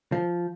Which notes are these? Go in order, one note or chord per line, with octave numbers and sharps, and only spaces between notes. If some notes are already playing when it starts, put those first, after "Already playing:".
F3